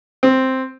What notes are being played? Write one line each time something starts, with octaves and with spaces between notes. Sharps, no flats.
C4